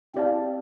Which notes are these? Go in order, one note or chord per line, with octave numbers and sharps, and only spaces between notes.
C4 E4 G4 D5 F5 A5